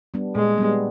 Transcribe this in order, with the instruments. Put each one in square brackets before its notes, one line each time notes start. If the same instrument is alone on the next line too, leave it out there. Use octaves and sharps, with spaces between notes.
[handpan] G3 B3 D4
[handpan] A#2 [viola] G#3
[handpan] G3 B3 D4